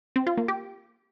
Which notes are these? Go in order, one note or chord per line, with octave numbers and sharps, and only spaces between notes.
C4
F4
A#3
G4